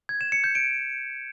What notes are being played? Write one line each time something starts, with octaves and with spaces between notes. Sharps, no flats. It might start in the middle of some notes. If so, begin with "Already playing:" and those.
G#6
E7
C#7
G6
D7